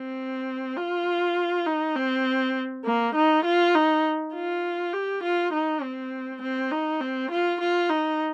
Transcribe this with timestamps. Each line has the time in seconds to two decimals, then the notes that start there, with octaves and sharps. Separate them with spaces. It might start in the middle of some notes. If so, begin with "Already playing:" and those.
Already playing: C4
0.77 F4
1.66 D#4
1.96 C4
2.85 A#3
3.15 D#4
3.44 F4
3.75 D#4
4.34 F4
4.93 G4
5.23 F4
5.53 D#4
5.82 C4
6.41 C4
6.71 D#4
7.01 C4
7.31 F4
7.61 F4
7.90 D#4